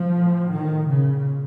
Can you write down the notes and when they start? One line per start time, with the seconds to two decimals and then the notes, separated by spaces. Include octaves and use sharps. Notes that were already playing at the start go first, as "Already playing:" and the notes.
Already playing: F3
0.15 A2
0.50 D#3
0.87 A#2 C#3